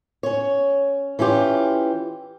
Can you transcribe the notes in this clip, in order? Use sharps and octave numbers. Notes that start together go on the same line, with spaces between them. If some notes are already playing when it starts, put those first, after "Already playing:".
C#4 C#5
E3 C#4 F4 G4